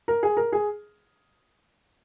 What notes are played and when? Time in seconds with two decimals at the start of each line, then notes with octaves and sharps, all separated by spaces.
0.08 A#4
0.23 G#4
0.37 A#4
0.52 G#4